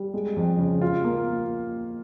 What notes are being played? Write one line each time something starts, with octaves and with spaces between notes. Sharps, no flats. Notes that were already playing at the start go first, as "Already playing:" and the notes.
Already playing: G3
G#3
F2
C#3
F4
A#3